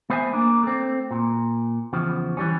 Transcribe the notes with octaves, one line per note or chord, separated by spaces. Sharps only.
A3 B3 C5 E5 G#5
A#3 D4
A3 C4
A#2
E2 C#3 F3
E3 G3 C#4